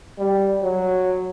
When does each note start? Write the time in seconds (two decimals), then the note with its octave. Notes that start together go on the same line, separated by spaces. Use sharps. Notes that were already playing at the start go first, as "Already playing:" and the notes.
0.19 G3
0.63 F#3